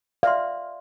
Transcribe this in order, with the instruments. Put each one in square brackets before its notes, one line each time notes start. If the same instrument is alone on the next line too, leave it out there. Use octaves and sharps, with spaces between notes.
[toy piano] D5 E5 C6 [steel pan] F5